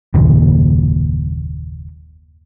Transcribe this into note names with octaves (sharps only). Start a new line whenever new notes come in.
F#1 D#2 A#2